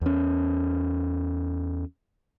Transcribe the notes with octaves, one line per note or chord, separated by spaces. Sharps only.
E2 C#4